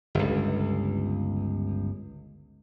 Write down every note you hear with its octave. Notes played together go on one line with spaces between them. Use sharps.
G1 C#2